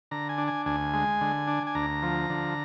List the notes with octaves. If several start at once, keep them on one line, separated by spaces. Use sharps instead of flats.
D3 A#5
G#5
D4
G#5
D2 G#5
G#3
D3
D4
G#5
D2 A#5
F3
D3